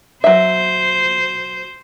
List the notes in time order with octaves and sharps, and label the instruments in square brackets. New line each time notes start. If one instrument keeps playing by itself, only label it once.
[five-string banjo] F#3 E5 [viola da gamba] C5